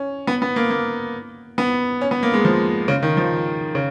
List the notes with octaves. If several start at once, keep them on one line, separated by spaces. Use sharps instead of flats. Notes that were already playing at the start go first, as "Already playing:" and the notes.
Already playing: C#4
B3
B3
A#3
A#3
B3
C#4
B3
A#3
G#3
F3
C#3
D#3
F3
C#3